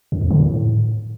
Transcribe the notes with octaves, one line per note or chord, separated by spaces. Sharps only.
F#2
E2
D3
A2